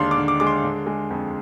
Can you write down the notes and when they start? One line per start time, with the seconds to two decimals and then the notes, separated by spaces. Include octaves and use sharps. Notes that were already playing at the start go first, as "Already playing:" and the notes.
Already playing: D#2 D3 G#3 D4 F5 C6
0.11 D6
0.17 D3
0.28 D6
0.40 G#3 D6
0.47 C6
0.63 D3
0.87 G#3
1.11 F2